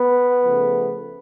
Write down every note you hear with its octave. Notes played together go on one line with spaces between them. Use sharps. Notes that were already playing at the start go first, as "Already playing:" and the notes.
Already playing: B3
C#3 F3 A3